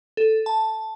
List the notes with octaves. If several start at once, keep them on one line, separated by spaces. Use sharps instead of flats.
A4
A5